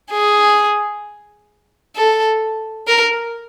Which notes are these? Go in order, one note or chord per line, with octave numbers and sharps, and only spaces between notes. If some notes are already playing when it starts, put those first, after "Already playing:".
G#4
A4
A#4